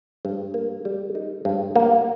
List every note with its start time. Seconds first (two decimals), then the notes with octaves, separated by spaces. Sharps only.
0.25 G2
0.54 A#3
0.85 G3
1.15 D#4
1.45 G2
1.76 A#3